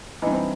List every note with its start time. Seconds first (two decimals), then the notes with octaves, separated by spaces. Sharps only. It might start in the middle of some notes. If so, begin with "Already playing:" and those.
0.22 G2 E3 D#4
0.32 C4